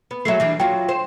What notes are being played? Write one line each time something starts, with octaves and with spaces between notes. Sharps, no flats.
B3
F#3 G#3 A3 E5 C7
E3 G3 D4
F#3 F4 G5
C5